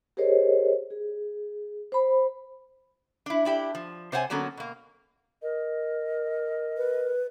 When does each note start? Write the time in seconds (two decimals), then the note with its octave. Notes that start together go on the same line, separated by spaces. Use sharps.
0.17 G4 G#4 A#4 C5 C#5 D#5
0.90 G#4
1.92 C5 B5
3.26 D4 E4
3.45 D4 E4 G4
3.75 F3
4.12 C3 C5 C#5 F#5 G#5
4.30 D3 F#3 A#3 B3 C#4 A4
4.57 B2 A#3
5.42 A#4 D#5
6.77 B4